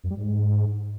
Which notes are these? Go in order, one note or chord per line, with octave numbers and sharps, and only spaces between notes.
F#2
G3
G#2